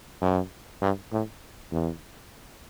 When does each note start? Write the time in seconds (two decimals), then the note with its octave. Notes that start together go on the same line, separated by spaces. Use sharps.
0.21 F#2
0.81 G2
1.12 A2
1.72 E2